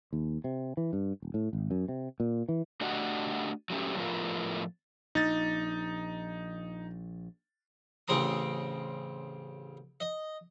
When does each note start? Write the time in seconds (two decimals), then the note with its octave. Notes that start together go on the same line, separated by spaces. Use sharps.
0.13 D#2
0.44 C3
0.77 E3
0.93 G2
1.22 D#1
1.34 A2
1.53 G#1
1.71 F#2
1.89 C3
2.20 A#2
2.49 E3
2.81 A3 D4 F#4 G4 D#5 F#5
3.70 F#3 A3 C#4 G4
3.97 A2 F3 A3 B3 F4 A#4
5.15 A#1 D#4 A6
8.08 A1 C#3 C4 A#5 D#6
10.00 D#5